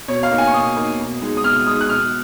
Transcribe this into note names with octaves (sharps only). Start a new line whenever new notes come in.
B2 C#5
F5
A#3 D#4
G#5
C#6
B2 D#6
A#3 D#4
B2
G#3 D#4
D#6
B2 F6
F6
G#3 D#4 D#6
F#6
B2 F6